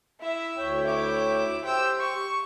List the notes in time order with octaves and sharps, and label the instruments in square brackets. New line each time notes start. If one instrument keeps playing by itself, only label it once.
[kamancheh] E4 E5
[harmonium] D2 C#5 G5
[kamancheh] E4 D6
[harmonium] G4 C5 [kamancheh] G5 E6
[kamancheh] C#6